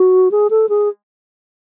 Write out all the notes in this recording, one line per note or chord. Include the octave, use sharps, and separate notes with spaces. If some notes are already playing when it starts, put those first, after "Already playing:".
Already playing: F#4
G#4
A4
G#4